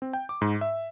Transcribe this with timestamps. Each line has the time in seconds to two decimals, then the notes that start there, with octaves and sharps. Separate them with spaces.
0.02 C4
0.13 G5
0.29 D6
0.42 G#2
0.61 E5